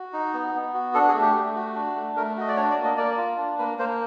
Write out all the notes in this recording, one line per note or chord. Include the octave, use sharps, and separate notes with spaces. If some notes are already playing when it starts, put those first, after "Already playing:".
Already playing: F#4
D#4
B3
B3
F#4
D4 A4
G#4
A3
G4
A3
F#4
D4
A3
A3 A#4
F#4 D#5
D5
D4 C#5
D5
A#3
D#5
A#3 D5
F4
D4
A#3 B4
A#3 C5